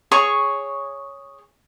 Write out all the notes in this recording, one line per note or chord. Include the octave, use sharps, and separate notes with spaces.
G#4 C#5 C#6